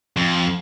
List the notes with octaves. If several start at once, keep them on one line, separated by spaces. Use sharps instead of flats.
F2